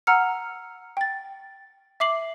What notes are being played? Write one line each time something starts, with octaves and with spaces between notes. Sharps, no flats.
F#5 A#5 E6 F6 C#7
G5 A6
E5 D6 C7 F#7